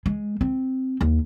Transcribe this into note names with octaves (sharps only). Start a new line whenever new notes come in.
G#3
C4
D#2